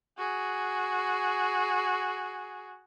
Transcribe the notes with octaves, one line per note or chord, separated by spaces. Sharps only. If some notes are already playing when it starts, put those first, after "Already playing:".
F#4 G#4